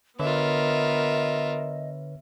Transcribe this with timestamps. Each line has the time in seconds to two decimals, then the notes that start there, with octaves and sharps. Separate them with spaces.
0.20 D3 B3 F4 A#4 B4 C#5 D#5 E5